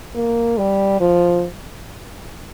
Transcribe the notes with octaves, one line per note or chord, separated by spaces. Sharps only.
A#3
G3
F3